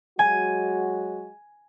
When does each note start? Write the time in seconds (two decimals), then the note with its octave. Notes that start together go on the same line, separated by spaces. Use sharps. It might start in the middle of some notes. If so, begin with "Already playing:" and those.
0.19 F#3 G#3 F#4 G#5